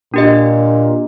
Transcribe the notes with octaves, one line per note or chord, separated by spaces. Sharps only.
A#2 D4 G4 D#5